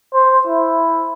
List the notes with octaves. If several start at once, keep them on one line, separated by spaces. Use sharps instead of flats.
C5
E4